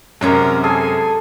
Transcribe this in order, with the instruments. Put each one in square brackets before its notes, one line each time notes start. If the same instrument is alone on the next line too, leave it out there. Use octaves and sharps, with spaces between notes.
[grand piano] F#2 C3 [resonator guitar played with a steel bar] G#3 C#4 A#5 [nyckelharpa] A#4
[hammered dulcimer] G#4 A4 [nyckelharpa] G#5